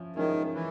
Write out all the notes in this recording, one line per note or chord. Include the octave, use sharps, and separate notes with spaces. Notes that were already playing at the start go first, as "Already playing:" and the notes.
Already playing: F3 C#4 E4
D#3 F3 G#3 C#4 E4
E3